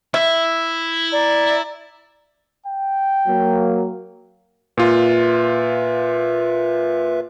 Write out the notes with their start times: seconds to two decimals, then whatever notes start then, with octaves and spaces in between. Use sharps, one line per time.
0.14 E4 E5
1.12 D5 A#5
2.66 G5
3.27 F#3 A#3
4.77 A#2 F4 B4 E5